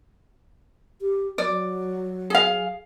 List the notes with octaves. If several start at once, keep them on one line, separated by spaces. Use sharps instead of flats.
G4
F#3 D5
G#4 F5